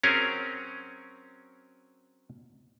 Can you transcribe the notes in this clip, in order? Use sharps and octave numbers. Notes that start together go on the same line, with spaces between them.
F#3 C4 C#4 G#4 A#4 C#5